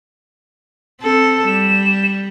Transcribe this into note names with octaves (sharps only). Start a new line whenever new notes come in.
C4 A4
G3 E7